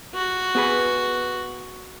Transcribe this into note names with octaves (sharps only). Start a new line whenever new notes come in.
F#4
B3 G#4 B4